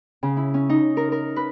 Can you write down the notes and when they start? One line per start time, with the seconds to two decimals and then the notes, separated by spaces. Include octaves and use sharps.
0.23 C#3
0.37 E4
0.54 C#4
0.69 D#4
0.97 A#4
1.12 A#4
1.36 B4